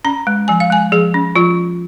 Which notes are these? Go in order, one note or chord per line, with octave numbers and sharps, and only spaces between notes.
C#4 A#5
G#3
F3 G#5
F5
G#3 G#5
F3 G#4
C#4
F3 F4